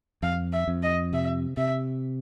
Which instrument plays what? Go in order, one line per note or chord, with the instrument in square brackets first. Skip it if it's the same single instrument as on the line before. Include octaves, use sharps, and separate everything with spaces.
[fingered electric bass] F2 [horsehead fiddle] F5
[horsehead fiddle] E5
[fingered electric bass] F2
[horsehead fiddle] D#5
[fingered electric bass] C3 [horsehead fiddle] E5
[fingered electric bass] C3 [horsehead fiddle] E5